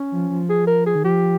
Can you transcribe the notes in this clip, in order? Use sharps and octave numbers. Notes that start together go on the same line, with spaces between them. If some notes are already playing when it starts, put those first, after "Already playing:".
Already playing: C#4
F3
F3
G#4
A#4
G#4
D#3
F3 G4